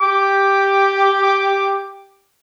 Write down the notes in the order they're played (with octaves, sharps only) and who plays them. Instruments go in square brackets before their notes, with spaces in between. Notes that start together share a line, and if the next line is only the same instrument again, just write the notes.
[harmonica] G4 D6